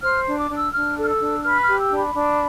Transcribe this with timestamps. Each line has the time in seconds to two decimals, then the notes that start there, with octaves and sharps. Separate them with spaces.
0.03 C5 F6
0.26 D4
0.39 D6
0.50 D4
0.56 E6
0.74 D4 F6
0.97 A4
1.03 F6
1.08 E6
1.21 D4
1.44 B4 F6
1.61 F6
1.67 G4
1.79 E6
1.90 D4
1.97 B5
2.14 D4